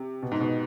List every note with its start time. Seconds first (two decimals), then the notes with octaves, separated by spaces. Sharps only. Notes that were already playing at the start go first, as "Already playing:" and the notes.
Already playing: C3
0.23 B2
0.32 G#2
0.40 B2